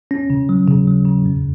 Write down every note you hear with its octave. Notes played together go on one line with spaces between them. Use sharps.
C#4
C#3
F#3
C#3
F#3
C#3
F2